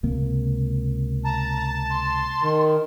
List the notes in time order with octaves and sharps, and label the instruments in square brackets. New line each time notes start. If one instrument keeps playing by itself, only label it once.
[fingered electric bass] C#2 C3 A#3
[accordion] A5 [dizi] A#5
[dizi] C6
[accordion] D#3